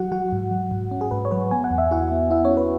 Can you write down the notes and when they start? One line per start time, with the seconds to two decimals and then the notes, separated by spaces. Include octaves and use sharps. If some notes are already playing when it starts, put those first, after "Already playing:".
Already playing: F#3 F#4 F#5
0.12 F#3 F#4 F#5
0.32 G#2
0.51 F#3
0.71 G#2
0.91 C#4
1.01 G#4
1.11 G#2 B4
1.25 C#5
1.31 F#3 B4
1.51 B3 G#5
1.64 F#5
1.71 E2
1.78 E5
1.91 E4 F#4 F#5
2.12 B3
2.30 B3 E4 E5
2.44 C#4 C#5
2.51 E4
2.57 B4